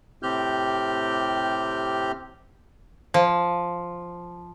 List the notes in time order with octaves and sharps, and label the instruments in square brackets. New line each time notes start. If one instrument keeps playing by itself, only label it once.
[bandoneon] A2 C3 C4 G4 F6 G6
[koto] F3 [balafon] C5